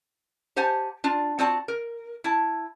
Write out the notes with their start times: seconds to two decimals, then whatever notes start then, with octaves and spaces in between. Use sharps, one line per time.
0.56 G4 C5 F#5 G#5 A5
1.04 D4 F4
1.39 C4 F4 F#4 D5 A5
1.68 A#4
2.24 E4 A5